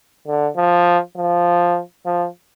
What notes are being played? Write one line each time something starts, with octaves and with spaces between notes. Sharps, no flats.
D3
F3
F3
F3